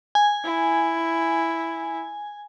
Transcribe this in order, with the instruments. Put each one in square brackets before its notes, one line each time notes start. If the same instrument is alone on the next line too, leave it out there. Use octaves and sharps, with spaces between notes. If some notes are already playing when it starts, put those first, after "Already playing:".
[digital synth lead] G#5
[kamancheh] E4